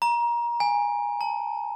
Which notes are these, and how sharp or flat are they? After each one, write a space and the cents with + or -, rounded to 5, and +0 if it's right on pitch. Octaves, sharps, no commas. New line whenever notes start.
A#5 +25
G#5 -10
A5 +25